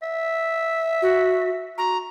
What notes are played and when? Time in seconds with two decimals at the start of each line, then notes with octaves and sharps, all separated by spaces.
0.02 E5
1.02 F#4
1.78 F#4 A#5